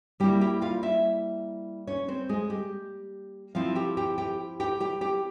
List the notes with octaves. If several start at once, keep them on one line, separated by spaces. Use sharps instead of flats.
G3 A#3 E4 G4 G5
G4 G5
F4 F5
E4 E5
C#4 C#5
C4 C5
G#3 G#4
G4
F3 C4 E4 F4 F5
G4 G5
G4 G5
G4 G5
G4 G5
G4 G5
G4 G5